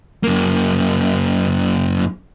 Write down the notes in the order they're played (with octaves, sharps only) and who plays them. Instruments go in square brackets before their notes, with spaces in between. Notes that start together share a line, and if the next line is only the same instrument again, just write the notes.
[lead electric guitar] F#2 A#3